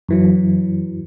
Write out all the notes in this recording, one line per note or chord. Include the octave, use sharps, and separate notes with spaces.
F#2 E3 F#3